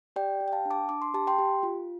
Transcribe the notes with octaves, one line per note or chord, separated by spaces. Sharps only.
G4 D5 G5
G4
G5
F5 A5
D4
A5 D6
D4 D6
C6
G4 A5
G5 C6
G4
F4